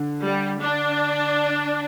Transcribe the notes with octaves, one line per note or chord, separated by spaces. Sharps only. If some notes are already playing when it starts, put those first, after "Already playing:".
Already playing: D3
G3
D4